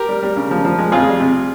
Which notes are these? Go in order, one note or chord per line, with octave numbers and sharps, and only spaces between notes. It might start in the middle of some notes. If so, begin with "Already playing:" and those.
Already playing: G4 A#4
G3
G3
C#3
F3
F3
G#3
F2 F4 G#4
G3
C3